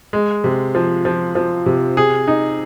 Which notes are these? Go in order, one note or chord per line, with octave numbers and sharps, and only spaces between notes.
G#3
C3
F3
F3
F3
C3
G#4
D#4